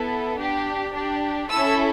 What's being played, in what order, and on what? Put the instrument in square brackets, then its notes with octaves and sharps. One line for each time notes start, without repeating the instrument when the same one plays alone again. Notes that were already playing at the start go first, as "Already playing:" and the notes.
Already playing: [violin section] B3 E4 A4
D4 G4
D4 G4
C#4 E4 A4 E6